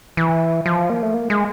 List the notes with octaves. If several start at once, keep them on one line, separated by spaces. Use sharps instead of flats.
E3
F3
A#3
A3
A#3
G#3